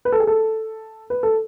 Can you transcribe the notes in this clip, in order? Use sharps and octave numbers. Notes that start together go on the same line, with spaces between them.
B4
A4
G#4
A4
B4
A4